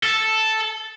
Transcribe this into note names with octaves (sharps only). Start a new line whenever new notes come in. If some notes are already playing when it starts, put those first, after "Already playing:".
A4